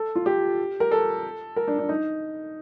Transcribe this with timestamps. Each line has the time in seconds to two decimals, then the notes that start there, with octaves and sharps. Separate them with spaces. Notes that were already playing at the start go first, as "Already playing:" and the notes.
Already playing: A4
0.16 F4
0.26 G4
0.80 A#4
0.91 A4
1.56 A#4
1.68 D4
1.79 D4
1.89 D#4